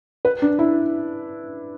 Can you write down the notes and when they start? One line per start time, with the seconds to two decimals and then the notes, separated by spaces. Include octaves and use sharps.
0.25 B4
0.42 D4
0.59 E4